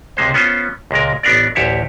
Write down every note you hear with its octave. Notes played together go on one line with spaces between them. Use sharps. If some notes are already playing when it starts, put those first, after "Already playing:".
C#2 C3 G#3 C5
B3 C#4 F4 C5
C#2 A#2 G#3 A#4
A1 B3 D4 A#4 D5
A1 D2 G4 C#5 E5